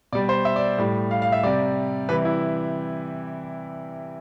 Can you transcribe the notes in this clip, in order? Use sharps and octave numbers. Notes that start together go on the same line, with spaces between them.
B2 G3 D5
C5
E5
D5
A2 G3
F5
F5
E5
C3 G3 D5
C3 E3 G3 B4
E4